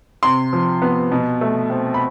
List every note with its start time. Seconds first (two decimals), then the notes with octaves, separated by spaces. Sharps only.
0.23 C3 C6
0.53 F3
0.82 B3
1.12 B2
1.41 A3
1.70 C4
1.94 B5